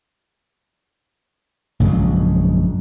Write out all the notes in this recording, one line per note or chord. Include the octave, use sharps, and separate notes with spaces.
A#1 F#2 C#3 G#3